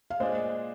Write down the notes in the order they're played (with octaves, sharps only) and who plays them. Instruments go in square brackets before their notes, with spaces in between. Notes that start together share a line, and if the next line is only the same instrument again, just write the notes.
[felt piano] F5
[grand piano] A#2 G#3 D4 G#4 [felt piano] C5 D#5